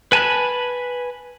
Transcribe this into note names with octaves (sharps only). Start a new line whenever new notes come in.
B4 G#5 A5 B5 F#6